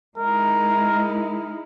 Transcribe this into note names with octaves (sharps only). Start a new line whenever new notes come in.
G#3 D#4 E4 A#4